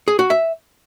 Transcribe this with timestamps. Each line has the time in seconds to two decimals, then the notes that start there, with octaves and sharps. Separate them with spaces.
0.08 G#4
0.19 F#4
0.30 E5